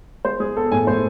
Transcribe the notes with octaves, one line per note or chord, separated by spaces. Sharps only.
G#3 C5
G#3 G#4
B3 A4
A2 G#5
A2 C5